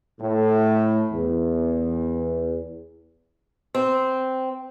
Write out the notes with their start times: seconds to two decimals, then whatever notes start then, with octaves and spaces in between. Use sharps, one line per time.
0.21 A2
1.13 E2
3.75 C4